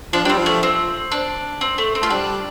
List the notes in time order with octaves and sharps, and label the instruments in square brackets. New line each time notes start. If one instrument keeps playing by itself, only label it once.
[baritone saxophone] F3 [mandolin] D4
[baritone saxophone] G3 [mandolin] D4
[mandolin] C4
[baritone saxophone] F3
[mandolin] A3
C4
D4
C4
A3
C4
[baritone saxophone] A3 [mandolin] F4
[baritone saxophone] G3 [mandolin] D4